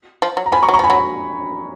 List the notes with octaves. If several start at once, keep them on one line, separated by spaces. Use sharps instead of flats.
F3
F#3
A#5
F3 G#5 B5
A#5 C#6
F#3
A#5 C#6
F3 G#5 B5
F#3
B5